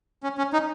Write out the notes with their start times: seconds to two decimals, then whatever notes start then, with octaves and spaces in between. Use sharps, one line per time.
0.23 C#4
0.38 C#4
0.53 D#4